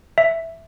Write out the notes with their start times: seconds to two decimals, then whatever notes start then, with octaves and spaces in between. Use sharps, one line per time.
0.18 E5